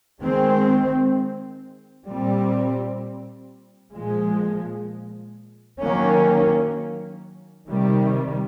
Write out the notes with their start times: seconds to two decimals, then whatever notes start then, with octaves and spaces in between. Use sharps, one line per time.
0.21 D#3 G#3 C4
2.08 A#2 G3 C4
3.93 A#2 F3 G#3
5.80 D#3 F#3 A#3 C#4
7.67 C3 D#3 G3